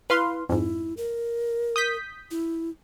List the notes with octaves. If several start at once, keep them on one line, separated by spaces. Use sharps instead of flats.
E4 B4 F5 C6
F2 G#2 E4
A#4
D#6 G6 B6
E4